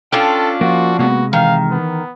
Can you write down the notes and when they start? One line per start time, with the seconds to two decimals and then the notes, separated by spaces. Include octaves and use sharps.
0.12 C#4 D4 F4 A4 G5
0.61 F3 A#3 F#4
0.99 C3 G#3 A#3 B3 F#4
1.33 D#3 E3 F5
1.70 B3